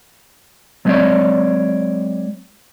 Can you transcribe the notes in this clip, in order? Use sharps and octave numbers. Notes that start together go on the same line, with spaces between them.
F#3 G#3 B3 C4 C#5 D5